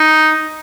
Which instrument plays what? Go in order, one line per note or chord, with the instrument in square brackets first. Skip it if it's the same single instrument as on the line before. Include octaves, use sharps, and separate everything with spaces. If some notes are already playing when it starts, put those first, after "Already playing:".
Already playing: [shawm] D#4